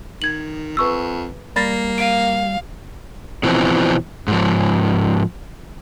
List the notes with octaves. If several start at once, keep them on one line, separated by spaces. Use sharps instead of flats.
D#3 G#6 F#7
F2 B4 C#6 E6
G3 A#3 B5 A6 A#6
F5 D7 D#7
B2 E3 F3 C4
G#2 F3